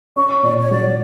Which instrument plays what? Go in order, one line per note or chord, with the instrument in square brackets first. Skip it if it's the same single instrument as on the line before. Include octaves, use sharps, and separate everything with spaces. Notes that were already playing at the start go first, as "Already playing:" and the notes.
[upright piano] C#4 [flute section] C#6
[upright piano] A#2 [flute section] D5
[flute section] C#5
[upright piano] F#3 [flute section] D5